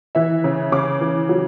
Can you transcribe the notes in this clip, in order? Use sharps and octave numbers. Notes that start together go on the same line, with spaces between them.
E3 E5
C#3
C#3 D6
E3
F#3